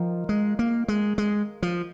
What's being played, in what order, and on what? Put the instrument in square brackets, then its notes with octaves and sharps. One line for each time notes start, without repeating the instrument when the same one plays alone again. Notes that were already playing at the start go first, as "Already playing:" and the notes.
Already playing: [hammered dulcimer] D#3 F4 [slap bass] F3
[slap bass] G#3
A#3
G#3
G#3
F3